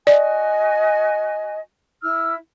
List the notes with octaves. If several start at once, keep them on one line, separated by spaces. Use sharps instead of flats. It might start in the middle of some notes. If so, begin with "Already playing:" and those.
F#4 D5 D#5 G#5
E4 E6 F6